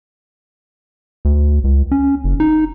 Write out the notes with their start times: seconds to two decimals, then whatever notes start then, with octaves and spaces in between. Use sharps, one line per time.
1.25 D2
1.64 C#2
1.91 C#4
2.24 F#1
2.40 D#4